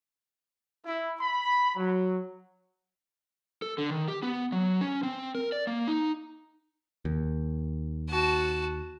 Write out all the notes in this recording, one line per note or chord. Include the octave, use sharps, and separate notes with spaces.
E4
B5
F#3
A4
D3
D#3
G4
B3
F#3
C#4
C4
A#4
D5
A#3
D#4
D#2
F#4 A5